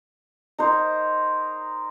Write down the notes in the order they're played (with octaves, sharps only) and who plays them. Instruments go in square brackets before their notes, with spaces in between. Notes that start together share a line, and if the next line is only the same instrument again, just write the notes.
[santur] D#4 A#4 C5